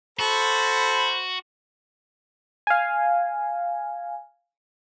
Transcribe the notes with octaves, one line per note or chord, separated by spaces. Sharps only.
F#4 A4 C5 B5
F5 G#5